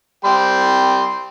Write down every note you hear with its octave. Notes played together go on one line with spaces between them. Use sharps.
G3 G5 C6